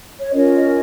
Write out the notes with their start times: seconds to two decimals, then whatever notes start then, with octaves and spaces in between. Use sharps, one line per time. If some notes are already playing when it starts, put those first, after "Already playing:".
0.19 C#5
0.32 C#4 F4 A#4 C#5 D#5